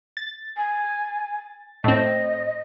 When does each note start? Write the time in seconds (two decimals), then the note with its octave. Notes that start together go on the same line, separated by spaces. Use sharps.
0.17 A6
0.57 G#5
1.84 A2 C4 D#5